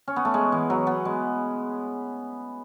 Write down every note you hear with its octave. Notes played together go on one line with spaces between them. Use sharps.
C#4
B3
A3
G#3
E3
F#3
B3
G#3